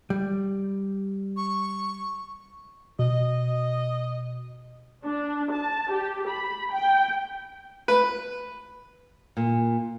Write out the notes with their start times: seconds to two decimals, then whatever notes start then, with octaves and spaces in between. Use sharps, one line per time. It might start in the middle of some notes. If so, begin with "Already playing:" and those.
0.10 G3
1.37 C#6
2.99 B2 D#5
5.04 D4
5.52 A5
5.90 G4
6.28 B5
6.72 G5
7.88 B4
9.37 A#2